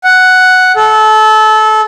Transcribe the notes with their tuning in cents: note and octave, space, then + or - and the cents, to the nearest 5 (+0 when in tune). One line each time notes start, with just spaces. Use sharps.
F#5 +0
A4 -25